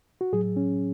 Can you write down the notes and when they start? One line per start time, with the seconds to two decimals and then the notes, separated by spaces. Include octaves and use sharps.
0.21 F#4
0.33 A2 F#3 G#4
0.56 C#4